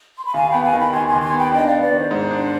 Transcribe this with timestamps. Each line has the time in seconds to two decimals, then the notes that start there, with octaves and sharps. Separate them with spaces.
0.16 C6
0.24 B5
0.34 D#2 F5 G#5
0.49 B3 G5 B5
0.64 F5 G#5
0.73 D#3
0.78 G5 B5
0.92 D#2 G#5 C6
1.08 D#2 G#5 C6
1.22 G#5 C6
1.32 B3 G5 B5
1.52 D4 D#5 G5
1.66 B3 D5 F5
1.82 B4 D5
1.92 D#3 C5
2.11 G#2
2.31 D4